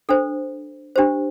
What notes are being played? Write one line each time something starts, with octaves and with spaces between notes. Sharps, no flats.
D4 A4 C5
D4 G4 C5